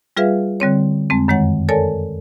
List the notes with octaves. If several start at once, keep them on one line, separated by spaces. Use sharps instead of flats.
G3 F4 G#4 B4 E5 F5
D3 G3 C4 C#5
F2 G#3 C4
F#2 D#3 G#3 C#5 F#5
A4 A#4 C#5 D5 G#5 A5